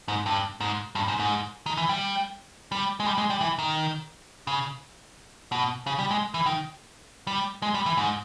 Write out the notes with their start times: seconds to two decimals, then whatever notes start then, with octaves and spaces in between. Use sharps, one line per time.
0.08 G#2
0.26 G2
0.60 G#2
0.95 G2
1.08 G#2
1.20 G#2
1.66 D#3
1.77 E3
1.89 G3
2.72 G3
3.00 G#3
3.06 G3
3.18 G#3
3.30 G3
3.41 E3
3.59 D#3
4.47 C#3
5.52 B2
5.86 C#3
5.99 G3
6.11 G#3
6.34 E3
6.46 D#3
7.27 G3
7.62 G#3
7.74 G3
7.86 E3
7.97 G#2